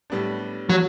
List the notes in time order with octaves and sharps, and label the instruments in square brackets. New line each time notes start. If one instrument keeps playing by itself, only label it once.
[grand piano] A2 G3 B3 D4
[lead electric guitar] F#3